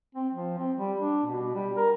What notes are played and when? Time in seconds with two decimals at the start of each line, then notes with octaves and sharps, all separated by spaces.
0.15 C4
0.34 F3
0.59 C4
0.77 G3
1.00 D4
1.26 B2
1.54 G3
1.76 A#4